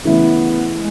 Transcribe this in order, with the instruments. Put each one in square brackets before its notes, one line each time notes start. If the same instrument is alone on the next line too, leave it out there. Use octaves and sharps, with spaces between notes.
[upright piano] C#3 E3 A3 E4 [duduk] B3
[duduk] G#3